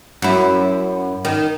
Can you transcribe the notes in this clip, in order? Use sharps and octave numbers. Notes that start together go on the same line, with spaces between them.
F#2 E4
D#3